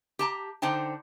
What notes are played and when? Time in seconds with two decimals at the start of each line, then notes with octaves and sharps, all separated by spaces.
0.19 G4 A5 A#5
0.62 D3 D#4 C5 G5 A5